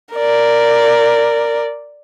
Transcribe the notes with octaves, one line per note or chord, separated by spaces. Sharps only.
A#4 D5